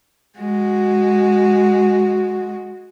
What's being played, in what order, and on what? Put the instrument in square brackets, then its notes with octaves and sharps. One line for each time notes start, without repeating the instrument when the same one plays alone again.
[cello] G#3 F#4